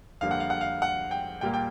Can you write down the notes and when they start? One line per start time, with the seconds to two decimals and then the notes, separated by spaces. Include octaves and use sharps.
0.21 F2 D3 G3 A#3 F5
0.31 F#5
0.40 F5
0.50 F#5
0.61 F5
0.82 F#5
1.11 G5
1.41 A#2 G3 A#3 G5
1.54 G5